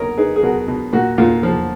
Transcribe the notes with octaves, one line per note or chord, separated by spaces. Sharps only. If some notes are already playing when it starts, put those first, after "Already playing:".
Already playing: B2 A#3 A#4 C#5 D#5
D#4 G#4 B4
G#4
B2 F#4 A#4
B2
A#2 F#4
A#2 F4
F3